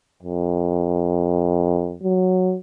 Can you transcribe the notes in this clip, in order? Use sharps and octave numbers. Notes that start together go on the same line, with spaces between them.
F2
F#3